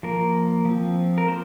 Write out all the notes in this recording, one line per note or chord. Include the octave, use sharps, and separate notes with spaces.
F3 A#3 A#4
F3 C4
A#4
A#3 C5